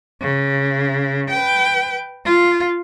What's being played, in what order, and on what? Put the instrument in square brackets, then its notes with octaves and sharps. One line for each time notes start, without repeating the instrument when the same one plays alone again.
[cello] C#3
B4 G5
F4